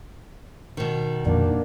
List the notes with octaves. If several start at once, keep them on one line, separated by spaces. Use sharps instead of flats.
B2 D#3
F2 A#2 D3 A#3 D4